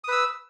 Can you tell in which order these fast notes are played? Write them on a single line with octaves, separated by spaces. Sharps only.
D#6 B4 E6